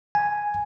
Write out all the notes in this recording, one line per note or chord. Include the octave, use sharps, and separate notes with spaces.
G#5